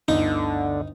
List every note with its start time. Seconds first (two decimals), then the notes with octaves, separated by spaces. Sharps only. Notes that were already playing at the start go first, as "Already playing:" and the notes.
0.08 G1 D2 D3 D#4